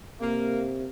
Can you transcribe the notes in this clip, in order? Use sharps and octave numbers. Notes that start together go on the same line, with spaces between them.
C3 A#3